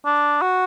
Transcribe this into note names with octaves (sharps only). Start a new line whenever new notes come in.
D4
F#4